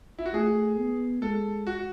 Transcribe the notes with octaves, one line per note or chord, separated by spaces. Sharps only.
E4
F#4
A3 G#4
B3
G#3 A4
F#4